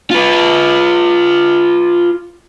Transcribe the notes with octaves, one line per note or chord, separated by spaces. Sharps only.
F4 B4